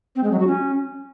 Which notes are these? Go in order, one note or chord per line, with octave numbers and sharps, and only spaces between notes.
C4
G#3
F#3
F#4
C#4